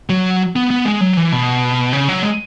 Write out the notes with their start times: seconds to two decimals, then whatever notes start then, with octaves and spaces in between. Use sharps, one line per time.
0.09 F#3
0.56 B3
0.71 B3
0.85 G#3
1.01 F#3
1.17 E3
1.32 B2
1.93 C#3
2.09 F#3
2.23 G#3